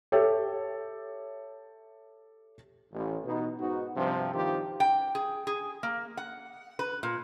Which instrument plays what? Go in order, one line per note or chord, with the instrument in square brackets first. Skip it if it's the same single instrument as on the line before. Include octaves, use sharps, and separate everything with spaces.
[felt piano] G4 A4 C#5 E5
[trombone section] A1
B2 B3 D#4
G#2 B3 D#4 F#4
G2 C3 F3
G2 D#3 C4 D#4 F4 G4
[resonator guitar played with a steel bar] G5
G#4
G#4
A#3
F#5
B4
A#2